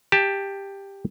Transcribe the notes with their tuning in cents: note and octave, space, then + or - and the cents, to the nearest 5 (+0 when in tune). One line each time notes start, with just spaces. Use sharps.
G4 +10 A5 +0